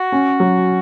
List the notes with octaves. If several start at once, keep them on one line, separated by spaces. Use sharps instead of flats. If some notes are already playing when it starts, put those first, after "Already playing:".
Already playing: F#4
C#4
F#3